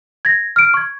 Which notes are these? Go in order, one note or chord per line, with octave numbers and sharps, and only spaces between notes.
G#6 A#6
F6 D7
C#6 G#6